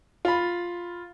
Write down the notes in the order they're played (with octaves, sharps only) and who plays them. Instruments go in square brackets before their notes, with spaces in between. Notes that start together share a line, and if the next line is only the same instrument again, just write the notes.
[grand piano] F4 B5